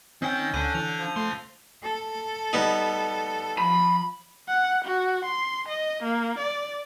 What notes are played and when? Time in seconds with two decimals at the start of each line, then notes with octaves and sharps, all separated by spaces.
0.22 D#3 C4 C#4 G5 E6 G6
0.54 D2 D3 D4 G6 D#7
0.75 E3 F7
0.98 F3
1.16 C#2 A3 C6
1.83 A4
2.53 G3 B3 D#4
3.58 F3 B5
4.49 F#5
4.85 F#4
5.25 C6
5.69 D#5
6.04 A#3
6.39 D5